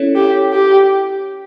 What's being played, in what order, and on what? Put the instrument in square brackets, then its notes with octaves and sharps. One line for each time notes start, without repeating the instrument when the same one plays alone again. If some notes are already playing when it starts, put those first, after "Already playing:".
Already playing: [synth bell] C#4 E4 A4 C#5
[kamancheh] G4
G4